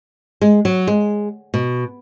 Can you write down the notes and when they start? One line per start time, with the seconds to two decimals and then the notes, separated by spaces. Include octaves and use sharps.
0.42 G#3
0.65 F#3
0.87 G#3
1.54 B2